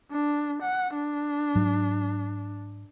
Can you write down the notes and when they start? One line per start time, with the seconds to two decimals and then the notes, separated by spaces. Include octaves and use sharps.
0.11 D4
0.62 F#5
0.94 D4
1.55 G#2 F#3